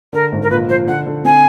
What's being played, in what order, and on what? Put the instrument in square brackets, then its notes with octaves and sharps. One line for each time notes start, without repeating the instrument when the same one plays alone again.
[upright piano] D3 [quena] A#4
[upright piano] G#1
[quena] A#4
[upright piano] A#2 [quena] B4
[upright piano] F3 [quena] C5
[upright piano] D3 [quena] F#5
[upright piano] D3
[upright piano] C4 [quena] G#5